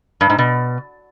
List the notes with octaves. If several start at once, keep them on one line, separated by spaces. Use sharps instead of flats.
G2
G#2
B2